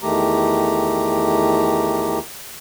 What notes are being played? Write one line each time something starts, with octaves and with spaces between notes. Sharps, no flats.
E2 D#3 A3 G4 A#5